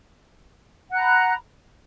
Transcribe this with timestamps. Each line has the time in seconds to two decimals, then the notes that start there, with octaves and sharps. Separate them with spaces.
0.89 F#5
0.92 F#6
0.95 A#5
0.97 B5